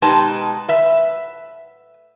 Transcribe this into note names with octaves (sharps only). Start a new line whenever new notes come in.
B2 G#3 D#4 G4 B4 A5
B4 E5